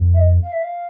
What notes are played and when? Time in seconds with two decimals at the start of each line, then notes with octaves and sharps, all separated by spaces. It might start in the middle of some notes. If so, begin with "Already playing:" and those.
Already playing: F2
0.14 E5
0.19 D#5
0.43 F5
0.52 E5
0.62 F5